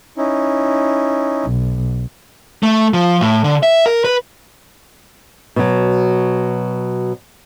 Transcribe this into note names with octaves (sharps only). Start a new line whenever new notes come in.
C#4 D#4 E4
B1
A3
F3
A2
D3
E5
A#4
B4
B2 F#3